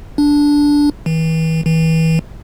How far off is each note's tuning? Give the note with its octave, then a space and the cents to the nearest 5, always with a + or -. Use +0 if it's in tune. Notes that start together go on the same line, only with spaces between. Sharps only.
D4 -10
E3 -35
E3 -30